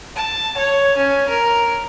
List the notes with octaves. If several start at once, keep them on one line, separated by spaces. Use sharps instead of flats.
A5
C#5
C#4
A#4